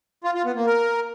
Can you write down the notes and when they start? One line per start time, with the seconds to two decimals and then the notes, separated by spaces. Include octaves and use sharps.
0.24 F4
0.35 F4
0.45 B3
0.56 A#3
0.66 A#4